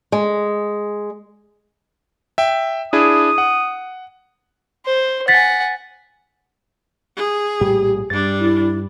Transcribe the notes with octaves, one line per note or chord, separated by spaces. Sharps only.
G#3
E5 G5
D4 E4 G#4 D#6
F#5
C5
F#5 G#5 A6 B6
G#4
A#1 A2 G3 G4
G2 G3 D4 A6
E4